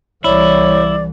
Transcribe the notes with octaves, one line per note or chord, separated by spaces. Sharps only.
C2 E3 E4 C#5 D5